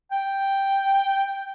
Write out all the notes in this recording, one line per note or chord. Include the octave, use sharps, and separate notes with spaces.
G5